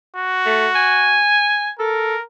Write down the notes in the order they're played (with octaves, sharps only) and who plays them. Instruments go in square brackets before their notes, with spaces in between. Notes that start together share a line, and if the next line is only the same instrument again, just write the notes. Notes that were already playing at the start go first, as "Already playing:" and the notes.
[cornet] F#4
[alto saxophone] A3
G#5
[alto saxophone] A4 [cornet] A#4